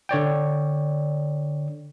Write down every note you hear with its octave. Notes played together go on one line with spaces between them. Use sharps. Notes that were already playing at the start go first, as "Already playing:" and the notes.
D3 C#5 D5 G5